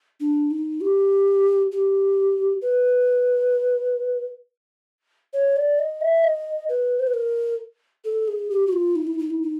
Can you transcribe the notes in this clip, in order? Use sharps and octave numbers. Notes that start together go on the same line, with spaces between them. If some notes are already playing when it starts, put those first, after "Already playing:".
D4
D#4
G4
G4
B4
C#5
D5
D#5
E5
D#5
B4
C5
B4
A#4
A4
G#4
G4
F#4
F4
D#4
E4
D#4
E4
D#4